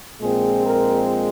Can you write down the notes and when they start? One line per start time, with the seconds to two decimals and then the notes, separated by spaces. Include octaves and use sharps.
0.20 A#1 A#2 G#3 C4 G#4
0.66 A#4